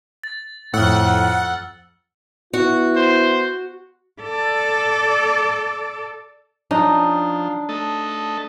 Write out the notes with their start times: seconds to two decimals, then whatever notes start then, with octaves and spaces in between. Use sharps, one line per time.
0.24 A6
0.74 F2 A2 F#5 E6 F6
2.53 B3 E4 F#4
2.96 C5
4.22 A4 D5
6.71 F3 D4 D#4
7.69 A3 A4 D#5